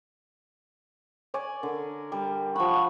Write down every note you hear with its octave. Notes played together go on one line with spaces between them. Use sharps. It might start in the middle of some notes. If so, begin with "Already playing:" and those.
C#5 D5 G#5
D3 A#4
G3
F3 F#5 B5 C#6